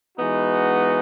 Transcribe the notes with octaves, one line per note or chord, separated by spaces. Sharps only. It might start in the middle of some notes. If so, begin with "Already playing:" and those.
E3 G#3 B3 D#4 F#4